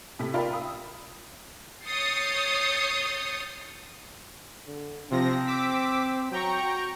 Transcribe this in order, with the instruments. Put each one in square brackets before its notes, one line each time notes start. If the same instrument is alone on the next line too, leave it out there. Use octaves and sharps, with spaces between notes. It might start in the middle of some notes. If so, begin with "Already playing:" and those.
[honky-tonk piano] A2 C3 A4 B6
F4 A#4 D5 E5 G5 B5
B5 D#6 E6
[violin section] C#5 D#6 G6 A6 C7 C#7
[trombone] D3
[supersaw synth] C3 F3 A#6 [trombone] C4
[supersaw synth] D6 E6 B6
[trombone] F#3 [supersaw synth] G5 A#5 C#6
[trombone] F#4